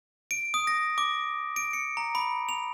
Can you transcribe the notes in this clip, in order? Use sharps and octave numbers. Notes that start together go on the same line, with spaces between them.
D7
D#6
A#6
D6
D7
C#7
A#5
B5
F7